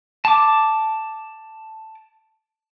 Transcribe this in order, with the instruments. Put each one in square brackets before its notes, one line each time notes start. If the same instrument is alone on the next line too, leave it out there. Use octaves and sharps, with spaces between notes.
[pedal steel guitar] A5 D6